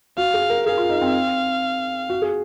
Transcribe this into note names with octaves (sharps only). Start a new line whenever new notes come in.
F#4 F5
G#4
A#4
G#4 F5
F4
D#4
C4
F#4
G#4